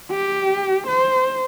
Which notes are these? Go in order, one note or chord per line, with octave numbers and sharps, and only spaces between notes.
G4
C5